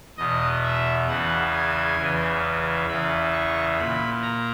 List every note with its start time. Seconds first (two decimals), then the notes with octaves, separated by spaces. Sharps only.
0.17 E2 B2 D#5
0.63 E5
1.08 E2 C#3 E3 F#5
1.54 G#5
1.98 E2 C#3 E3
2.88 E2 C#3 E3 B5
3.33 C#6
3.78 A#2 B5
4.22 A#5